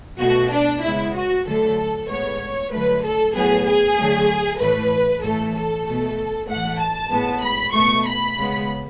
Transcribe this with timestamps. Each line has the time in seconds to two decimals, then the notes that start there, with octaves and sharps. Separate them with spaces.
0.19 B2 A3 F#4
0.51 D4
0.82 C#3 G#3 B3 E4
1.14 F#4
1.45 D3 F#3 A3 A4
2.08 A2 G#3 B3 C#5
2.71 D3 F#3 A3 B4
3.03 A4
3.34 A2 F#3 B3 G#4
3.65 G#4
3.97 D3 F#3 A3
4.59 A2 E3 A3 B4
5.22 A2 E3 A3 A4
5.54 A4
5.85 B2 A3
6.48 A2 E3 A3 F#5
6.79 A5
7.10 A2 G#3 B3
7.42 B5
7.74 B2 A3 C#6
8.06 B5
8.37 C#3 G#3 B3